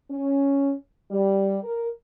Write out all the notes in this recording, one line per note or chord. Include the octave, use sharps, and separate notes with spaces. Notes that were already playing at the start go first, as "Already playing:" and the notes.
C#4
G3
A#4